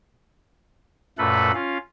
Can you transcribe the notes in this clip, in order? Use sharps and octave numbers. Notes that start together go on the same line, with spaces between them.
F#2 A#2 A3 A4 B4 B5
C#4 F4 F5